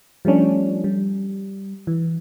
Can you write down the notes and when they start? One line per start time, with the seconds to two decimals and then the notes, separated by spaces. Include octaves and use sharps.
0.25 F3 G3 A3 C#4 D4
0.84 G3
1.87 E3